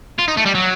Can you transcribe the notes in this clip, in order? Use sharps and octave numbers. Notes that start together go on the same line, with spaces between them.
F4
D#4
A3
G3
F#3